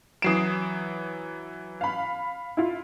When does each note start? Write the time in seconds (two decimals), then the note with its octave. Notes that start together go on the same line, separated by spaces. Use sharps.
0.22 E3 F#3 D#6 C7 D7 E7
1.81 F5 B5
2.57 E4 F4